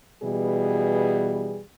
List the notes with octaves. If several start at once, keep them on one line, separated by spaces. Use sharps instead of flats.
B2 E3 G3 G#4